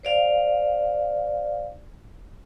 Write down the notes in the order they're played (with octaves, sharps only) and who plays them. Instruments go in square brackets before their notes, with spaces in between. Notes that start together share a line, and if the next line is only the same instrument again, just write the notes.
[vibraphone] C5 D5 F5